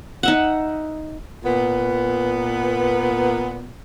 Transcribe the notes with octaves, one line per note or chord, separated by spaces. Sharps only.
D#4 E5 F#5
A#2 B3